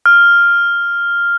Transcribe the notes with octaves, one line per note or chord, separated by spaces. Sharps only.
F6